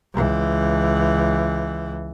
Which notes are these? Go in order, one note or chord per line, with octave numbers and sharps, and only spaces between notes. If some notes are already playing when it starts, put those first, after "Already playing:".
C#2 E3